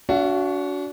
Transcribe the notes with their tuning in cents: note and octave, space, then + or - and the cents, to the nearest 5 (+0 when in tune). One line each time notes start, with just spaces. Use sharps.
D4 -40 F#4 +0 E5 +45